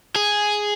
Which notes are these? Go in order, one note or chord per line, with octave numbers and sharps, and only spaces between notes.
G#4